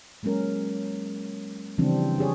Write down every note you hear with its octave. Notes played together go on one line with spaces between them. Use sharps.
F#3 G#3 A#3 C#4 A#4
C#3 E3 F3 G3 C4 D4
D4 G4 G#4 C#5 D5